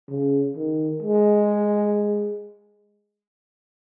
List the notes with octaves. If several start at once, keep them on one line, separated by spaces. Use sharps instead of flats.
C#3
D#3
G#3